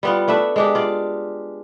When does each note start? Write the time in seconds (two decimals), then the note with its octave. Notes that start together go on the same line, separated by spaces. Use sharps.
0.03 G3 B3 F4
0.28 A3 D4 B4 E5
0.56 G#3 D4 G4
0.75 F4 D5